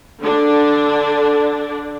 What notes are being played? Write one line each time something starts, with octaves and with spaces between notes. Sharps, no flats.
D3 D4